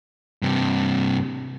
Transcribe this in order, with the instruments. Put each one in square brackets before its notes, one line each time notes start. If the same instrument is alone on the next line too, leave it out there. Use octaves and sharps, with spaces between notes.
[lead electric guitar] G2 C3